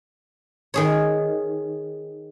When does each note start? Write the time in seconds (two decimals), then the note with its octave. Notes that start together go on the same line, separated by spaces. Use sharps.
0.74 D#3 G#4 C#5